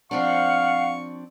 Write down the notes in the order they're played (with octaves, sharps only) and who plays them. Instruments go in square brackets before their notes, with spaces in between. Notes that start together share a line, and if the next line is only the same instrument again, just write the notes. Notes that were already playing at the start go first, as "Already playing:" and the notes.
[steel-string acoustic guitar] F3 C4 D4 [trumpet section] F5 [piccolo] F#5 [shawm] C#6